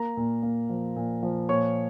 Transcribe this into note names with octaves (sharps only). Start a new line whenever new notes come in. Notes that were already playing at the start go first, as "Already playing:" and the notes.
Already playing: A#3 A#4 A#5
A#2
A#3
F3
A#2
F3
A#2 C#5 C#6